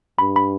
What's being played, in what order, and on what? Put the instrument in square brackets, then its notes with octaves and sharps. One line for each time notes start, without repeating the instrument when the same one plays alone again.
[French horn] G2 [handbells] B5
[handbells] B5